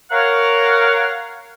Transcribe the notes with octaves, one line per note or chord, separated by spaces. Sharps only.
A#4 C#5 F5 F#5